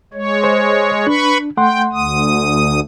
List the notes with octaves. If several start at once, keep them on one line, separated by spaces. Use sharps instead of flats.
G#3 C#5
C5
D4 B4 B5 C#6
A3 F#5 G5 C6
D2 D#6